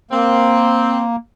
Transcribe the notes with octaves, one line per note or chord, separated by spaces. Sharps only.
A#3 C4